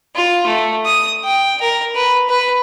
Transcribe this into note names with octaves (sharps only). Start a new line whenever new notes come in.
F4
A3
D#6
G5
A#4
B4
B4